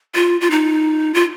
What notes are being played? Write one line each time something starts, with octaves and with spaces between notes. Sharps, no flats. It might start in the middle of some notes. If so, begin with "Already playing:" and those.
F4
F4
D#4
F4